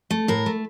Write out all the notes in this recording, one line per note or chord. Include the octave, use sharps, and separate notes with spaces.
A3
A2 A#4
A3